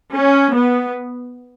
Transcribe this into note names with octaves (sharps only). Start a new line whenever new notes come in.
C#4
B3